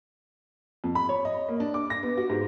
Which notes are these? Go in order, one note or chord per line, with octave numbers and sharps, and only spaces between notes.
F2
B5
C#5
D#5
A#3
D4
D6
A#6
B3
F#4
G#2